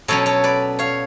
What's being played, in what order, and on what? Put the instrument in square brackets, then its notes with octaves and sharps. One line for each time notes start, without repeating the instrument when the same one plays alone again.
[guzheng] B2 F#3 C#4 A4 C#5
A4 C#5
B4 D5
C#5 F5